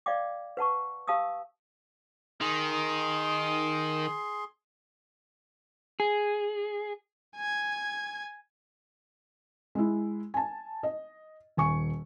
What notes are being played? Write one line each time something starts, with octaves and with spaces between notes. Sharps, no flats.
D5 D#5 F5 G5 D6
B4 F#5 A5 C#6
G4 F5 A5 D#6 E6
D#3 G#4 C6
G#4
G#5 G#6
G#3 E4
G#5 A5
D#5
D#1 G#5 C#6